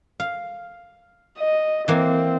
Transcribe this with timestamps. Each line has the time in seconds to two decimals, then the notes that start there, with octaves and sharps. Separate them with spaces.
0.20 F5
1.38 D#5
1.88 E3 A#3 C4